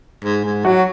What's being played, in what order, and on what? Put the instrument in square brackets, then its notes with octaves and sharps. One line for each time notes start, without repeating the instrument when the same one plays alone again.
[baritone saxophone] G#2
G#2
[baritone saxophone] F#3 [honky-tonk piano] F#4